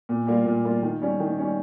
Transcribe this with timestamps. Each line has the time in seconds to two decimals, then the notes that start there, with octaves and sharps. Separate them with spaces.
0.09 A#2
0.27 G3 A#3 F4
0.46 A#2
0.65 G3 A#3 F4
0.83 D#3
1.01 G3 C#4
1.20 D#3
1.39 G3 C#4